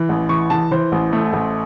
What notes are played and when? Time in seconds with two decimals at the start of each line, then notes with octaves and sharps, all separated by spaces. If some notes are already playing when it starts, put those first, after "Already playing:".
Already playing: E3
0.09 A1
0.29 E3 C#6
0.50 E3 A5
0.71 E3 C5
0.92 A1
1.13 A3
1.33 A1